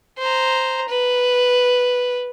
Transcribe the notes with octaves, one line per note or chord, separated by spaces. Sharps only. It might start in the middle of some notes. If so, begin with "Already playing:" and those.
C5 A#5
B4